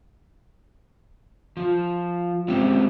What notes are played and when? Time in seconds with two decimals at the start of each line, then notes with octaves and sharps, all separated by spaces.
1.57 F3
2.48 G#3 C4 C#4 G4